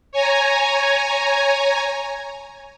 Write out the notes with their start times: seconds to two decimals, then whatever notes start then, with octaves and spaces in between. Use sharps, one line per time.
0.12 C#5 G#5 A#5